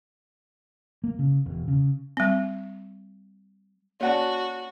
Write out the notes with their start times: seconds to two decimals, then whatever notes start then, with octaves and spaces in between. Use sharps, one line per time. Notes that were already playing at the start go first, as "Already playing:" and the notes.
1.04 A#3
1.19 C#3
1.46 E1
1.68 C#3
2.17 G3 C4
4.01 A#3 C#4 F#4 D5 F#5 A5